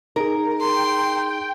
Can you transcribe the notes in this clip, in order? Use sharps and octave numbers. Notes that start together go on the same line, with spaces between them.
D#4 G#4 A#4
G5 C6